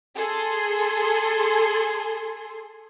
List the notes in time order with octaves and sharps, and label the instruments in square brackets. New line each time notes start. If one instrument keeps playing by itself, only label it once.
[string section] G#4 A4 C6